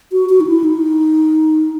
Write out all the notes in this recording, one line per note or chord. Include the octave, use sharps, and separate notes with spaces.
F#4
F#4
D#4
E4
D#4